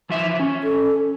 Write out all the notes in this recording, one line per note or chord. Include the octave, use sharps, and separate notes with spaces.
E3 F3 E5
C#4
A4